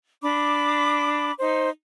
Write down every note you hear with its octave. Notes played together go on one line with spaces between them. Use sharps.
D4 B5 D6
D#4 C5